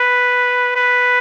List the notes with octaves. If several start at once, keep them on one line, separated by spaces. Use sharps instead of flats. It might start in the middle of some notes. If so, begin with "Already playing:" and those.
Already playing: B4
B4